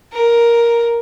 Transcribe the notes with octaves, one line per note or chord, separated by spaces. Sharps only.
A#4